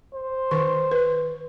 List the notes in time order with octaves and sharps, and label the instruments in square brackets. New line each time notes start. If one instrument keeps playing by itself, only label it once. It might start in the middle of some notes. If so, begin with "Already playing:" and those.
[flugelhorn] C5
[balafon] D#3 C#6
B4